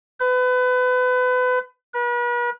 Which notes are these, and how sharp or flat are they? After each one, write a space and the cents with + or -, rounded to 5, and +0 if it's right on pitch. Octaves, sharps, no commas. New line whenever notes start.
B4 +30
B4 -40